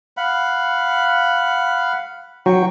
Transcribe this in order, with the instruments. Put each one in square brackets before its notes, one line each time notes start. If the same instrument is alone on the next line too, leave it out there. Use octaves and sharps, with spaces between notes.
[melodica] F5 F#5 B5
[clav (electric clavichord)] F#3 [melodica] G5 C#6